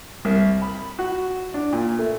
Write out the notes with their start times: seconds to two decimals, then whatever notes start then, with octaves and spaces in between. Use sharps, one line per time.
0.25 C2
0.62 B5
0.99 F#4
1.54 D4
1.73 A#2
1.99 A3